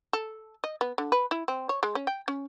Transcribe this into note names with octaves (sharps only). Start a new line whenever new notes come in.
A4
D#5
B3
D3
B4
E4
C4
C#5
G#3
C#4
G5
C#4